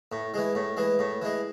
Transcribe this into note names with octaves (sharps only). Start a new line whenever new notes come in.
A2
E3 G#3
A2
E3 G#3
A2
E3 G#3